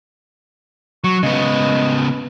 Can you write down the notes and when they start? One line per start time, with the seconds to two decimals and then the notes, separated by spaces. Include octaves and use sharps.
1.04 F#3 C#6
1.23 C#3 G#3 B3